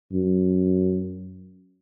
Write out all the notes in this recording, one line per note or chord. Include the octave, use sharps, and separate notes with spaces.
F#2